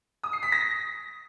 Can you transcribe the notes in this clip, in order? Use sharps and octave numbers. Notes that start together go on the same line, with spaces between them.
D#6
C7
B6
A#6